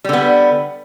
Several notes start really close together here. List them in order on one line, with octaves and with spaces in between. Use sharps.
G3 D3 B3